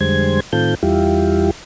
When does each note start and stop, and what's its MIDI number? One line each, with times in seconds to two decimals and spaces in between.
0.01 0.40 41
0.01 0.40 50
0.01 0.40 55
0.01 0.40 56
0.01 0.40 72
0.01 0.40 92
0.53 0.75 45
0.53 0.75 51
0.53 0.75 60
0.53 0.75 65
0.53 0.75 69
0.53 0.75 91
0.83 1.51 40
0.83 1.51 55
0.83 1.51 64
0.83 1.51 65
0.83 1.51 67